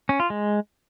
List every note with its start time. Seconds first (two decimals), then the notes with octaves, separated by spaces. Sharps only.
0.09 C#4
0.20 F4
0.30 G#3